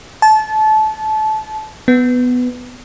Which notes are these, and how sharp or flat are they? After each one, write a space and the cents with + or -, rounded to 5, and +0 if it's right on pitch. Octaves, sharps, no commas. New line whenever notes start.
A5 -25
B3 +10